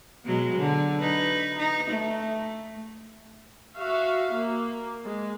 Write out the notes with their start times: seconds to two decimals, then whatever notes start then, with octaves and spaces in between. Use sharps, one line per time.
0.25 B2 F#3 G#3
0.58 D3
0.99 D#4 B4
1.58 D#4
1.90 A3
3.77 F#4 E5 F5
4.34 A#3
5.07 G#3